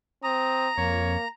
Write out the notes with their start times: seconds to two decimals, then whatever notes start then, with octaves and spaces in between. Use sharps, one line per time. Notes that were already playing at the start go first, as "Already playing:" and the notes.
0.24 C4 A#5 D#6
0.78 F2 A#3 C#5